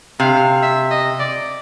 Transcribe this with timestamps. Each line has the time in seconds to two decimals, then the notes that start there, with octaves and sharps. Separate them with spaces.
0.20 C3 F5
0.63 E5
0.91 D#5
1.20 D5